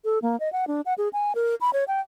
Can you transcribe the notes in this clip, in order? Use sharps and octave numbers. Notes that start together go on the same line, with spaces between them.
A4
A#3
D#5
F#5
D4
F#5
G#4
G#5
A#4
B5
C#5
G5